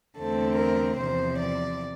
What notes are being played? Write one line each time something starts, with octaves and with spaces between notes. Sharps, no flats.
E2 D3 A3 C4 A4
A#4
E2 C3 F3 C5
D5